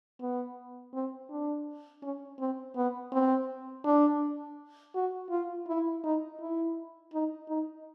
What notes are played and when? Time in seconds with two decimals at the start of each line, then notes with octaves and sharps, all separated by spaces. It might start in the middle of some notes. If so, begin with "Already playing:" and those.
0.21 B3
0.94 C4
1.30 D4
2.02 C#4
2.39 C4
2.76 B3
3.12 C4
3.84 D4
4.94 F#4
5.30 F4
5.68 E4
6.04 D#4
6.40 E4
7.13 D#4
7.49 D#4